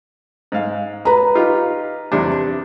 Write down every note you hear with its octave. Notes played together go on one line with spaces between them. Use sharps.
G#2 F5
B4 A#5
D#4 F4 G4
E2 C3 D4